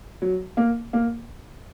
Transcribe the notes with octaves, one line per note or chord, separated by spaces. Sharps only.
F#3
A#3
A#3